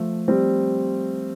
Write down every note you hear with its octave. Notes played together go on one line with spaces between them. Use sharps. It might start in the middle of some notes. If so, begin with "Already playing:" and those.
Already playing: F3 A3
G3 C4